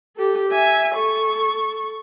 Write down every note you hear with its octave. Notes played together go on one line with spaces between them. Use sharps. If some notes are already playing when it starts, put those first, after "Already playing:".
G4 A4
E5 G#5
A4 C#6